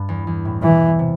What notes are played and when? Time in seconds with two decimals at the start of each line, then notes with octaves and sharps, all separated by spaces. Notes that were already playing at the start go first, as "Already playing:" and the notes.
Already playing: G2
0.09 E2
0.27 E2
0.45 A2
0.63 B2 E3
0.99 C3